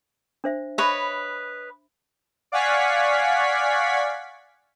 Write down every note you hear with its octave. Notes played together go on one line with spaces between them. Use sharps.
D4 C5 E5
B4 C#5 D#5 E5 B5
D5 F5 F#5 G#5 C#6 B6